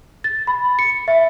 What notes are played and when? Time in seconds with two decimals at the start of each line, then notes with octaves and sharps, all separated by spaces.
0.24 A6
0.47 B5
0.79 C#7
1.08 E5